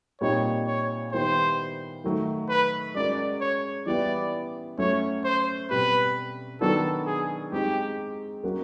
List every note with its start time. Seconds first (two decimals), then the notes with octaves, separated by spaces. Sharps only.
0.21 A#2 G3 C4 D#4 C#5
0.67 C#5
1.12 D#3 G3 B3 E4 G4 C5
2.04 D#3 F#3 A3
2.49 B4
2.95 G#3 C#4 F#4 A#4 D5
3.41 C#5
3.86 E3 G3 B3 E4 D5
4.78 F#3 A3 C#4 C#5
5.24 C5
5.70 B2 G3 C4 B4
6.61 D#3 F#3 B3 D4 A4
7.06 G#4
7.52 G#3 C4 D#4 G4
8.43 F#3 A#3 C#4 F#4